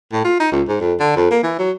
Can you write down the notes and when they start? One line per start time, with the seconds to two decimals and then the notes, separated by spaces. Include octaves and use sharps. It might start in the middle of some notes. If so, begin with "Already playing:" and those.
0.12 A2
0.25 F4
0.40 D#4
0.52 C#2
0.68 G#2
0.81 F2
1.00 D3
1.16 F2
1.31 A#3
1.44 E3
1.59 F#3